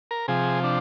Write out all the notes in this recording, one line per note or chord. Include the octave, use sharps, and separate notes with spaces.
A#4
C3 F3 G#4
D4